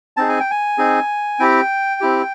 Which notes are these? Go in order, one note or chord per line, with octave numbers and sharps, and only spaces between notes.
C4 D#4 G#4 A5
G#5
G5
G#5
C4 D#4 G#4
C4 E4 G4 G5
C4 E4 G4